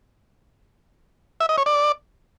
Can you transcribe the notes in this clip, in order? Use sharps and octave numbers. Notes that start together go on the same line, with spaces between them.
E5
D#5
C#5
D5